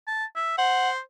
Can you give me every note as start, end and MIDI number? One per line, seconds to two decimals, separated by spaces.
0.07 0.25 81
0.36 0.55 76
0.58 0.99 72
0.58 0.90 78